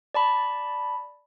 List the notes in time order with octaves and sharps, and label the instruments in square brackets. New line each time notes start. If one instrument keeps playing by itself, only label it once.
[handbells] D5 A5 B5